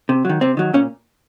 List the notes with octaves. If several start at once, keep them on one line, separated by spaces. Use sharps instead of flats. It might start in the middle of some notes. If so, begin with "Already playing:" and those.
C3
D#3 F#3
C3 C4
D#3 F#3
A#2 C#4